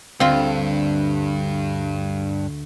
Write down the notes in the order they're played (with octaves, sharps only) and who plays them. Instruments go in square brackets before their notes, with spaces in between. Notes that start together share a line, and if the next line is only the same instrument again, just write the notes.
[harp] D2 [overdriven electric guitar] G2 [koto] C4 F4